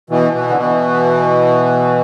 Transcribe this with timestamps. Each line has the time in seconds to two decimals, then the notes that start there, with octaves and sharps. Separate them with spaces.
0.10 B2 E3
0.33 B2 E3
0.49 D3
0.57 B2 E3